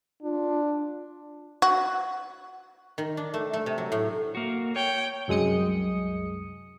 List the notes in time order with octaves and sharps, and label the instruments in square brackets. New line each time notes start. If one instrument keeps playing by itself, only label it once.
[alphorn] D4 [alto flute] F4
[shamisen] F#4
[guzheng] D#3
D4
A3
A3
C3
F#3
A2
[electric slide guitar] A#3 F#4
[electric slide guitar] C#5 [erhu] G5
[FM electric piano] C2 F#2 G#3 D#6 C#7